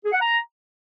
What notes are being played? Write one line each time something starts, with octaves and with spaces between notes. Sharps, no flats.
G#4
F#5
A#5